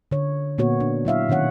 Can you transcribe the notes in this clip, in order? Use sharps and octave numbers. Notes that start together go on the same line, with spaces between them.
D3 C#5
A#2 A#3 B3 F#4 C#5
D4
F#3 E4 E5 F5
B2 D#3 C#4 C#5 F#5